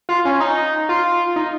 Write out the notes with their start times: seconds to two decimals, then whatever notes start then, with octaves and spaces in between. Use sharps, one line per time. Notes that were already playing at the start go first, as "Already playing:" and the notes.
0.09 F4
0.25 C#4
0.40 D#4
0.89 F4
1.36 D#4